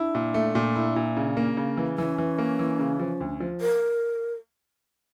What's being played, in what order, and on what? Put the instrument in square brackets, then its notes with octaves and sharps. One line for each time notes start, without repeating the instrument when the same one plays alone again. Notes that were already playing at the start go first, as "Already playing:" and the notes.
Already playing: [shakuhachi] D4 [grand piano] E4
[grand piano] A#2
A3
A#2
E4
A#2
C#3
A#3
C#3
E3
[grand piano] E3 [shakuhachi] C#4
[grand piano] E3
A#3
E3
C#3
F3
D2
F3
[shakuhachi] A#4